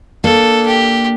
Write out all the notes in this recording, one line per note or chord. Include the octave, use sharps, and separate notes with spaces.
A#3 D4 A4
G4